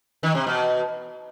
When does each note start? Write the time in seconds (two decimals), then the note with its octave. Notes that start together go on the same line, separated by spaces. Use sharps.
0.23 D#3
0.35 C3
0.47 B2